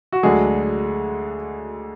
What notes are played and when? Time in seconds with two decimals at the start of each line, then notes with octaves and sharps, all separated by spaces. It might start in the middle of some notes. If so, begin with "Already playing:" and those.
0.13 F#4
0.23 D2 D3 F#3 G#3 G#4